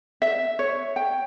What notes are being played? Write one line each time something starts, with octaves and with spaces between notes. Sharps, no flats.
E5
C#5
G5